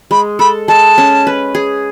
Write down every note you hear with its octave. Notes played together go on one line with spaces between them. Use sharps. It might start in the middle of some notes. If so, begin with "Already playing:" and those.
G#3 B5
A4 B5
G#3 A5
C#4
B4
G#4